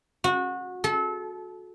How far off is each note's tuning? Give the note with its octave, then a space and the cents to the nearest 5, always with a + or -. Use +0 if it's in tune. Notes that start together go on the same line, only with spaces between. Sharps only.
F#4 -25
A4 -30